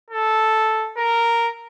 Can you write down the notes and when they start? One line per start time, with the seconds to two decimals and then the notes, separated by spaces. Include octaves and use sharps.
0.10 A4
0.97 A#4